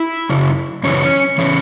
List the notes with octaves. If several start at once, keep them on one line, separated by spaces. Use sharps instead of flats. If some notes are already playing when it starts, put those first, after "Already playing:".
Already playing: E4
F#2 C#3
F#2 C#3 E3 C#4
C#3 E3 C#4